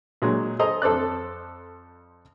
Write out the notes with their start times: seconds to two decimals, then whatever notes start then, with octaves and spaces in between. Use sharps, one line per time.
0.22 A#2 F#3 G#3
0.59 G#4 A4 C5 D#5 A#5
0.82 F2 A4 C5 D5 F#6